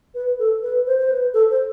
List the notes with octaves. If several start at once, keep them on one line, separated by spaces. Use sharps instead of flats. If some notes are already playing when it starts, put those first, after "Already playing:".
B4
A4
B4
C5
C5
B4
A4
C5